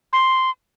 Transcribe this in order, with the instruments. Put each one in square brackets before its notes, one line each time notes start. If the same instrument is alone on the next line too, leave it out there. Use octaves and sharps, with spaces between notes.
[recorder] C6